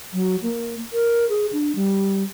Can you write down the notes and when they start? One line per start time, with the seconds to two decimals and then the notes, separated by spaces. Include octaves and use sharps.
0.13 F#3
0.42 A#3
0.93 A#4
1.29 G#4
1.53 D4
1.76 G3